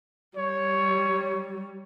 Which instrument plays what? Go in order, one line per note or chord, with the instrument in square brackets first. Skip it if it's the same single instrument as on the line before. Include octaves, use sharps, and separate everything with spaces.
[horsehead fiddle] G3 [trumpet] C#5